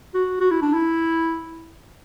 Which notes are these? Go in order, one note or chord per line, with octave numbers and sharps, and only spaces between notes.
F#4
F#4
E4
D4
E4